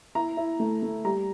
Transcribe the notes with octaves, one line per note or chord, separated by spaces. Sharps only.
E4 A#5
E4
A3
A3
G3 A#5